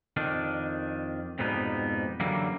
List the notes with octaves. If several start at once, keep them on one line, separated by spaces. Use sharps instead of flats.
F2 D#3 D4
F2 G#2 B2 G3 B3 D#4
F#2 D3 E3 F#3 G3 A#3